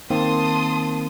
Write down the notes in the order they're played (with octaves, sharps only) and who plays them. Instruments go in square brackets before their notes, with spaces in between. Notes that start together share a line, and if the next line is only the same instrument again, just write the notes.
[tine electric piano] D#3 A#3 C4 [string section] A5 C6 D#6